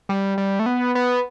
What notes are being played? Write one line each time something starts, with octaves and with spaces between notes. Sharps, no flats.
G3
G3
A3
B3
B3